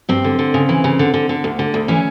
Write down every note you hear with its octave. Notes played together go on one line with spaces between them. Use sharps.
G2 C4
D3
D3
C#3
E3
C#3
D3
D3
D3
D2
D3
D2
E3 C#4